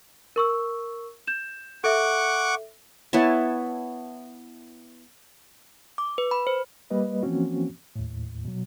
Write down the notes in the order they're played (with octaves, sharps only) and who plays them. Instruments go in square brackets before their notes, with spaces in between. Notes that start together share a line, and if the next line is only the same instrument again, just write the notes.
[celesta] A#4 C#6 E6
G6 E7
[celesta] A4 E5 [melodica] F#5 C#6 D6
[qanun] B3 E4 C#5 A5
[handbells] D6
B4
B5
C5
[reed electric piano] G3 A#3 B4 D#5
E3 F3 A#3 C4 C#4 F#4
D#2 A2
B2 F#3